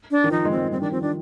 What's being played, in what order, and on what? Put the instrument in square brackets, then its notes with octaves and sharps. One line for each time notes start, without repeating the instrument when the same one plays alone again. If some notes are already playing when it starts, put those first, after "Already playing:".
[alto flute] D4
[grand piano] D#3
[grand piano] F3 [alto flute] D#4
[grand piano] G#3
[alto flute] C4
[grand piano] G#3
[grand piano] G3 [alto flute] C4
[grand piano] D#3 [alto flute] D4
[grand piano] F3 [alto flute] C4
[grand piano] D#3 [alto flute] D4